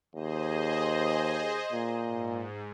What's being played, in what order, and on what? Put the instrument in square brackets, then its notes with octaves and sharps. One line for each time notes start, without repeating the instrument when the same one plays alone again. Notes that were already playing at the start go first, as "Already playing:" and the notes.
[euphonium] D#2 [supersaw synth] G#4 C5 D#5
[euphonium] A#2
[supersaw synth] G#2